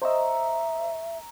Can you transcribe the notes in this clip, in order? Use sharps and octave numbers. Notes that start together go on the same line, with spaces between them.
C5 D#5 E5 A#5 C#6 E6